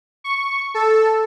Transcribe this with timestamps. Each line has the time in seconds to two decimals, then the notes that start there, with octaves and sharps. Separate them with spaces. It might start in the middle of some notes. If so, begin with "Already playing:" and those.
0.24 C#6
0.74 A4